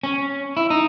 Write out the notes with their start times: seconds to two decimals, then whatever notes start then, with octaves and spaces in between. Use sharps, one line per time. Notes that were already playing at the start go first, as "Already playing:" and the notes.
0.03 C#4
0.57 E4
0.70 D#4